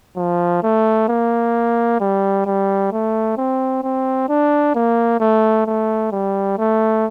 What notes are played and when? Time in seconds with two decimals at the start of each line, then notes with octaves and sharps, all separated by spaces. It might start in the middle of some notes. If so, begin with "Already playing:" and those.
0.17 F3
0.63 A3
1.08 A#3
2.01 G3
2.46 G3
2.92 A3
3.37 C4
3.83 C4
4.29 D4
4.75 A#3
5.20 A3
5.66 A3
6.12 G3
6.58 A3